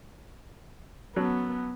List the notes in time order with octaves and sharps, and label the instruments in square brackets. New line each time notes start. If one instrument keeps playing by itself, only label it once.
[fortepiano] F#3 C#4 A4 [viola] B3